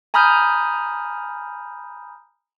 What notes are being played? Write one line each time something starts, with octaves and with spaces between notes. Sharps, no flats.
G#5 A#5 B5 D#6 F6 G6